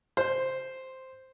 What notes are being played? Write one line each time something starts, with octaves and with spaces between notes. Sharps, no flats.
C5